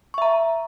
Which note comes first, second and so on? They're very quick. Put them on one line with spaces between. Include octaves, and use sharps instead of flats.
C#6 E5 A#5